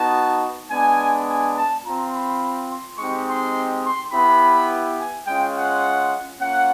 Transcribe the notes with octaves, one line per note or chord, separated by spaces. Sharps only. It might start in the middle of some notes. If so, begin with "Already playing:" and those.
Already playing: B3 D#4 F#4 A5
G#3 B3 D4 G#5
G#5
A5
C4 F4 A#5
B5
C6
G#3 C4 D#4 G4 C#6
C6
C6
B3 E4 G4 B5
G#5
G#3 C#4 F4 G5
F#5
A#3 C#4 F4 F#5